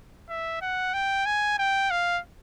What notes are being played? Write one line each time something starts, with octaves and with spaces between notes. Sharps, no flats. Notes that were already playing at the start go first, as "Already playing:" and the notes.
E5
F#5
G5
G#5
G5
F5